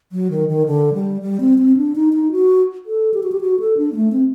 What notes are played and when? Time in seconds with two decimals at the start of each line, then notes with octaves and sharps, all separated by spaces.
0.12 F#3
0.31 D#3
0.49 D#3
0.66 D3
0.94 G3
1.22 G3
1.40 C4
1.58 C4
1.77 D4
1.96 D#4
2.13 D#4
2.32 F#4
2.86 A4
3.14 G4
3.23 F#4
3.32 G4
3.41 F#4
3.60 A4
3.77 D4
3.92 A#3
3.96 A3
4.12 C4